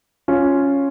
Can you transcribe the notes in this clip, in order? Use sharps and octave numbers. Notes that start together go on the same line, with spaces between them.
C#4 F4